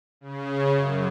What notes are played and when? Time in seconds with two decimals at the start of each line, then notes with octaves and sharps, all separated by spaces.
0.21 C#3
0.75 F#2